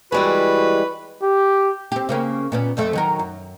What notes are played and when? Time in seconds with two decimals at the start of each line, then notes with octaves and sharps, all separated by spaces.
0.12 E3 G3 G#3 F#4 B4
1.23 G4
1.92 C4 G4
2.09 C#3 A#3 C#4
2.52 A#2 B3 C#4
2.77 F2 F3 A3
2.93 D#3 F#3 A#4
3.19 F#2